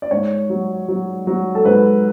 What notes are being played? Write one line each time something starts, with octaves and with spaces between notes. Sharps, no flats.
D5
G#2 C#5
F#3
F#3
F#3
A4
G#2 B4